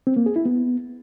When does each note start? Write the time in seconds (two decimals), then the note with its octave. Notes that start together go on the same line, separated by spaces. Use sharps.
0.07 C4
0.17 A#3
0.26 G#4
0.36 E4
0.46 B3